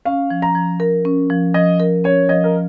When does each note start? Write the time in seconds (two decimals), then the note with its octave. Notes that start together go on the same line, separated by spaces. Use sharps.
0.05 C#4 F5
0.30 F3
0.42 A#5
0.55 F3
0.80 A#4
1.05 C#4
1.30 F3
1.54 F3 D#5
1.80 A#4
2.04 C#4 C#5
2.29 F3 D#5
2.44 A#4